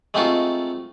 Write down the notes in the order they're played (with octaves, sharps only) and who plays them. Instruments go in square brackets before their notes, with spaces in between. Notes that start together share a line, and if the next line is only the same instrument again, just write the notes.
[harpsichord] G#3 A3 C4 D#4 F4 F#4